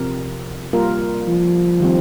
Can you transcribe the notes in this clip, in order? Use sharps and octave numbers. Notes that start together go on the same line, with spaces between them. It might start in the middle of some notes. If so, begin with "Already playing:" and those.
Already playing: C3 F3 C4 G4 A#4
G3 A#3 F4 A#4
F3
D#3 G3 C4